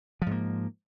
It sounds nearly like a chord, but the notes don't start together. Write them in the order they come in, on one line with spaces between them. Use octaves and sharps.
F3 G#2 A#3